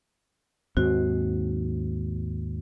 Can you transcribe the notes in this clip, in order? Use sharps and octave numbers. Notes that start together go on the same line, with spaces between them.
D#2 G#2 C4 F#4